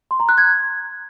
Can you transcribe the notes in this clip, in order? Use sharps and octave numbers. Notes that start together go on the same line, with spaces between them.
C6
A#5
F#6
G#6